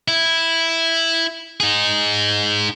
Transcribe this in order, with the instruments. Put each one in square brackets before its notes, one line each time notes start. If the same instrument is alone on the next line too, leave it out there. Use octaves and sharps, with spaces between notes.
[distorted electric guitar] E4
D#4 G#4